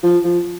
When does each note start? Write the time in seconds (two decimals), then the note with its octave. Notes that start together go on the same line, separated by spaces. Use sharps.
0.03 F3
0.24 F3